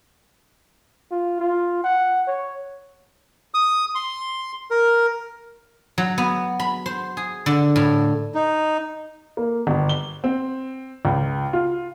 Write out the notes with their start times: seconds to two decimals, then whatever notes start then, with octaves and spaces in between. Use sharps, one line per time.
1.11 F4
1.40 F4
1.83 F#5
2.27 C#5
3.54 D#6
3.95 C6
4.70 A#4
5.98 F#3
6.18 B3
6.60 B5
6.86 C5
7.17 G#4
7.46 D3
7.76 A2
8.35 D#4
9.37 A#3
9.67 G1
9.89 G7
10.24 C4
11.05 C#2
11.53 F4